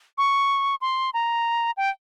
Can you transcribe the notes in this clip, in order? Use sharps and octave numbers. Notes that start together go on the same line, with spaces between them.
C#6
C6
A#5
G5